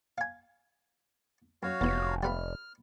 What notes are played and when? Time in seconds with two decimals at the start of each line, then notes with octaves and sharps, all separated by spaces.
0.18 F5 G#5
1.63 F#2 F#4 C#5 F5
1.81 F1 E2 E3
2.23 G3 B4 B5 F6